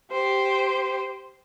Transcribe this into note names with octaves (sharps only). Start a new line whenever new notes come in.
G4 C5